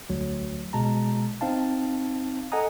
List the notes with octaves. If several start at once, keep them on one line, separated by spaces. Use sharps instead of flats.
D2 F#3
B2 G#3 A5 A#5
C4 D#4 F5 A5
A4 D#5 F#5 G#5 A#5 D#6